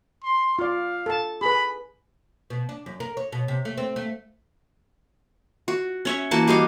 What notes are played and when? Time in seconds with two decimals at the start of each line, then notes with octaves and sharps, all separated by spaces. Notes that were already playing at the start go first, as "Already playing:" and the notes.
0.23 C6
0.59 F4 D5 F5
1.06 A4 A5
1.41 G#4 B4 B5
2.50 B2
2.69 D4
2.86 F#2
3.00 A#4
3.17 C#5
3.32 B2
3.48 C3
3.65 A3
3.77 C4
3.96 A3
5.68 F#4
6.05 C#4 C#5 E5
6.31 E3 A#3 F#4 A5
6.48 G3 F#4 D#5 F5